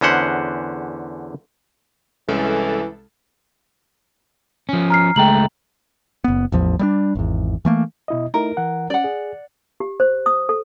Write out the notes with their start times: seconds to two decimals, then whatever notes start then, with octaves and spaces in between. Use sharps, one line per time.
0.01 E2 D3 C#4 C5 F#5
2.28 C2 E3 G#3 C#4 A4
4.69 F3 C#4
4.90 A#5 F6 C7
5.16 C#2 G#3 A3 G5 A#5 F#7
6.24 F#1 B3
6.52 A1 E2 F3
6.79 G3 G#3 D4
7.15 G#1 E2
7.65 E3 A3 A#3
8.08 B2 E4 D#5
8.34 A3 D#4 E4 A#4
8.57 E3 F#5
8.90 C#4 D5 F#5
9.04 G#4
9.80 G4
10.00 C5
10.26 D#6
10.49 A4